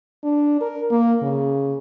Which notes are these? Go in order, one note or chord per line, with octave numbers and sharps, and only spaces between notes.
D4
A#4
A#3
C#3